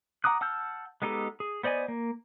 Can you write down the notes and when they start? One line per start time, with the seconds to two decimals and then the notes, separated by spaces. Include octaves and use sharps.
0.24 F#5 A#5 D6 D#6 F#6
0.41 F#5 A5 E6 F6 G6
1.02 G#3 B3 D#4 G4 A4
1.40 G#4
1.63 B3 C5 D5 D#5 G#5
1.88 A#3